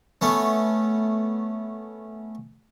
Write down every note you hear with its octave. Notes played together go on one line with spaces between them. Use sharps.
A3 B3 C#4